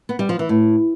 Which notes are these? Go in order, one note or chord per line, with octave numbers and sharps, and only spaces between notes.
B3
G3
F3
E3
A2